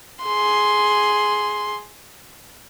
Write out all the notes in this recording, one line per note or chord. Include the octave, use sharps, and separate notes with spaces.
G#4 C6